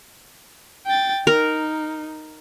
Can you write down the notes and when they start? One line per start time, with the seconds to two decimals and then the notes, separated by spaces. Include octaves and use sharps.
0.86 G5 A6
1.27 D#4 A#4